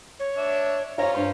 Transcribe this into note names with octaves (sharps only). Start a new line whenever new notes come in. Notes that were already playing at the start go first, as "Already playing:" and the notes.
C#5
D4 E5
C#4 F4 C5 C#5 A#5
G2 C5 C6